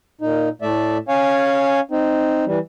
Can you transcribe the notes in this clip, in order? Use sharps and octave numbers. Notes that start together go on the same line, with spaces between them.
A#2 D#4
A2 A3 D5 E5
C#4 C#5 F5 G#5
C4 D#4
E3 G3